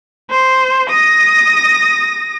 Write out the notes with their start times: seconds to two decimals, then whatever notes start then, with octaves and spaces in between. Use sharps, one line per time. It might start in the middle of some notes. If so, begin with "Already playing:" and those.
0.30 C5
0.90 D#6 A#6